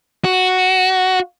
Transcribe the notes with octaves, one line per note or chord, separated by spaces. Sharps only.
F#4